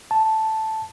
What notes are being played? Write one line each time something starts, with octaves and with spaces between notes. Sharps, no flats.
A5